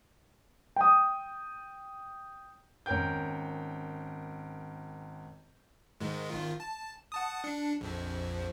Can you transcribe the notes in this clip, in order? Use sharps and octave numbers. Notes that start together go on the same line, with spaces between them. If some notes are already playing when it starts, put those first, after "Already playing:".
G5 D#6
G#1 C#4 A#4 G5 G6
G#2 D#3 G#3
G#1 D#3 F4
A5
F#5 A5 D#6
D4 C#7
A#1 F2 F3